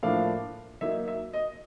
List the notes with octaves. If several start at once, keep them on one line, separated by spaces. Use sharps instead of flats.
A2 F3 A#3 D4 F5
F#3 A#3 D#4 E5
E5
D#5